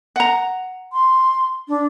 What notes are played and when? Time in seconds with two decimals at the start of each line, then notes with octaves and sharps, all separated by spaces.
0.16 F#5 A#5
0.93 C6
1.68 D4